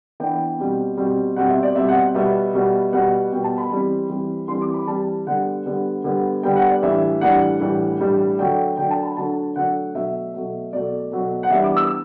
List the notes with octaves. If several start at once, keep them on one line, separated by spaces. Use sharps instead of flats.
E3 B3 D4 G5
B2 G3 C4
B2 G3 C4
B2 G3 C4 F#5
E5
D5
B2 G3 C4 E5
F#5
B2 G3 B3 E5
B2 G3 B3
B2 G3 B3 F#5
B2 G3 B3 G5
A5
B5
E3 G3 C4
E3 G3 C4
E3 G3 C4 C6
D6
B5
E3 G3 C4 A5
D3 G3 B3 F#5
D3 G3 B3
D3 G3 B3
D3 G3 B3 G5
F#5
D5
A2 E3 G3 D4 E5
A2 E3 G3 D4 F#5
A2 E3 G3 D4
A2 E3 G3 D4
D3 F#3 A3 D4 G5
D3 F#3 A3 D4 G5
A5
B5
D3 F#3 A3 D4 A5
D3 F#3 A3 D4 F#5
B2 F#3 A3 E5
B2 F#3 A3
B2 F#3 A3 D5
B2 F#3 A3
F#5
E3 G3 B3 D4 E5
D6
E6